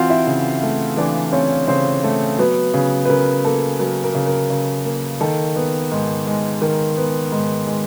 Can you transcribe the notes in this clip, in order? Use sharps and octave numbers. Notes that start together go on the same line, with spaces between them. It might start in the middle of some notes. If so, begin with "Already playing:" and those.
Already playing: E3 C4 F4 F#4 F5 F#5
E4 E5
C#3
A3
E3 D4 D5
C4 C#4 C#5
C#3 C4 C5
A3
F#3 B3 B4
C#3
B4
C#3 A#4
A#3 A4
F#3 A#4
A#4
C#3
A#4
C#3
A#3
D#3 A4
B3
G#2
G#3
D#3 A#4
B3
G#2
G#3